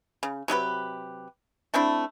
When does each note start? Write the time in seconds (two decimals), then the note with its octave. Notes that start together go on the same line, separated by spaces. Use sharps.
0.23 C#3
0.48 C3 F#3 G4 B4
1.74 A3 C4 D4 E4